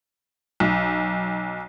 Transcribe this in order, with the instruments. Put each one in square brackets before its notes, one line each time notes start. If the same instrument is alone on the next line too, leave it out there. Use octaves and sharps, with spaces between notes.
[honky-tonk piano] B1